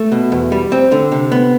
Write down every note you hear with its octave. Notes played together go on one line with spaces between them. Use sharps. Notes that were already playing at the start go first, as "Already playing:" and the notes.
Already playing: A3
B2
E2
G3
C4
D3
C3
B3